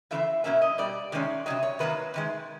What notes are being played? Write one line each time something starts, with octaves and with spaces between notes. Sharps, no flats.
C#3 E3 A3 C4 E5
B2 F#3 A#3 C#4 E5
D#5
B2 G3 D5
C3 D#3 G#3 C#4 D5
C3 D#3 F#3 D#5
C#5
C3 D#3 F#3 A#3 B4
C3 D#3 G#3